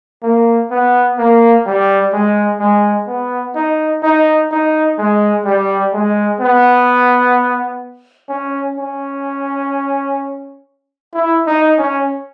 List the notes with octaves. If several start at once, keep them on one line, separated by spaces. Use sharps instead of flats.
A#3
B3
A#3
G3
G#3
G#3
B3
D#4
D#4
D#4
G#3
G3
G#3
B3
C#4
C#4
E4
D#4
C#4